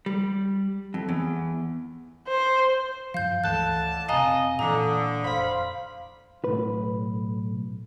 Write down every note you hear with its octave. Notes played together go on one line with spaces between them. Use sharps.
G3
F2
E2
C5
G2 F3 F5 G6
C#2 A2 D3 E3 A5 F#6
F1 C3 D#5 F5 G#5 A#5
A#2 D3 E3 A4 A#5 D6 D#6
F1 C5 F5 B5
B1 A2 B4